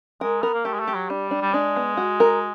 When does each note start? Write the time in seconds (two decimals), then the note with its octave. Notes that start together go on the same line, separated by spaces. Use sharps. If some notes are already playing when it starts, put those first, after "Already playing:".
0.21 G#3 A#4
0.42 B3 A#4
0.54 A#3
0.65 A3 G4
0.74 G#3
0.80 A3
0.88 G4
0.94 F#3
1.09 G3 D4
1.31 D4
1.42 G3
1.53 G#3 D4
1.76 B3
1.97 F#4
2.20 A#4